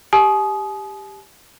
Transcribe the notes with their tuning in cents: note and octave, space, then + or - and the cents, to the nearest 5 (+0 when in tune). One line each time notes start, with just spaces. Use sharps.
G4 +5 G#5 +40 D#6 +0